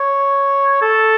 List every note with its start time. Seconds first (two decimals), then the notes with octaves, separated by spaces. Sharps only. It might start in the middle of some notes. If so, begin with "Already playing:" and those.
Already playing: C#5
0.82 A4